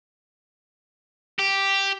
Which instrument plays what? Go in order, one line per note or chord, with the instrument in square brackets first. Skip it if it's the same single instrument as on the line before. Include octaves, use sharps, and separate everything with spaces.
[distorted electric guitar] G4